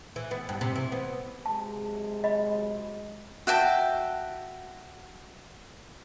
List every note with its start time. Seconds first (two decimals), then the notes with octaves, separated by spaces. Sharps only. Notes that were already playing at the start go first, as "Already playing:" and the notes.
0.16 E3
0.31 B3
0.49 G2
0.61 C3
0.76 E3
0.92 B3
1.46 C3 F#3 G#3 A5
2.24 D#5 B5
3.47 F#4 E5 G5 A5